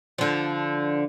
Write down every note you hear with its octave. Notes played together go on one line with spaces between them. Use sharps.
D3 F3